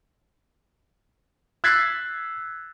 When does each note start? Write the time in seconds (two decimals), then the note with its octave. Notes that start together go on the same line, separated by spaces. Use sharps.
1.64 E6 F#6 G#6 A6 B6 C7